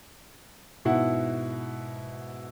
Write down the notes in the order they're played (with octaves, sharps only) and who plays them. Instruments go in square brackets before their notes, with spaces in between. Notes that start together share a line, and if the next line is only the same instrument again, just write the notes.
[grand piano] G#2 B2 E4 F#5